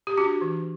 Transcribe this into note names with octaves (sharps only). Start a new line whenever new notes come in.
G4
D4 F#4
E3